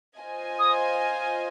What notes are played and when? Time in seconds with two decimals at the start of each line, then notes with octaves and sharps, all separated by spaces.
0.19 F4 C5 D#5 G#5
0.59 D#6